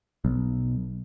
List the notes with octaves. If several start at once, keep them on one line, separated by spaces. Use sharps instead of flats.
B1